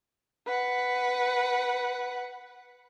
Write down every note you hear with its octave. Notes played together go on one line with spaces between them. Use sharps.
B4 F#5